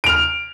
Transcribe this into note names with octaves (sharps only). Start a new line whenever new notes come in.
F6 D7 F7